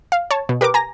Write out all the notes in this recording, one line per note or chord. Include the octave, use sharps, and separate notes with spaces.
F5
C#5 A5
B2
G4 A#4 B4 D6
G#5 A#5 A#6